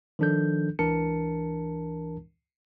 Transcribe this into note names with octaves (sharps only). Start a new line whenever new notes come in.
D#3 F3 D4 A4 G6
C#2 E3 D4 A#4 A5 C#7